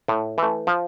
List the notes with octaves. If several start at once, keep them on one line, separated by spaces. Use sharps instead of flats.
A2
E3 A3
F3